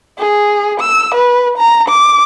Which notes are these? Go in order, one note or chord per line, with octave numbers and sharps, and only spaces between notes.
G#4
E6
B4
A#5
D6